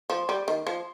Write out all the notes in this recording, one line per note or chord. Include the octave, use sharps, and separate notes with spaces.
F3
G3
D#3
F3